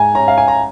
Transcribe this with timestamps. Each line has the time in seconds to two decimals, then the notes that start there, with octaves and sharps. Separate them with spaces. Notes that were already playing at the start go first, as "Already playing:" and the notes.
Already playing: G#2 G#5 A#5
0.15 C#4 A#5
0.28 F5
0.38 G#5
0.48 A#5